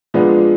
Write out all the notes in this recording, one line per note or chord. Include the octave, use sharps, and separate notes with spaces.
A#2 F3 G#3 B3 D4